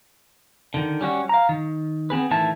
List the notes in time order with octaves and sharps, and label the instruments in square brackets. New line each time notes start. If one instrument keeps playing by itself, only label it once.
[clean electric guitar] D3 D#3
G3 C#4 F#4
F5 A#5
D#3
B3 C4 G#4 B4
A2 D#3 E3 E4 A5